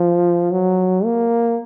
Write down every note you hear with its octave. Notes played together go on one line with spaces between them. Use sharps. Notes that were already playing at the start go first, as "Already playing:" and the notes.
Already playing: F3
F#3
A#3